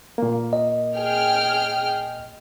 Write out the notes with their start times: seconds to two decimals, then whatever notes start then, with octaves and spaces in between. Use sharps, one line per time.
0.18 A#2 A#3
0.53 D#5
0.97 G#4 G5 F6